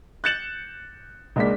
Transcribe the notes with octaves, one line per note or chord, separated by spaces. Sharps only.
F#6 G6 A6 C#7 E7 F#7
C#2 G#3 A#3 D4 B6